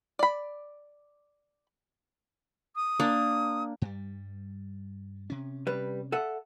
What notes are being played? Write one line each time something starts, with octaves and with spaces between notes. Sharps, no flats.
D5 B5
D#6
A#3 D4
G2 G3
C3 C#4
G3 B4
A4 E5 F#5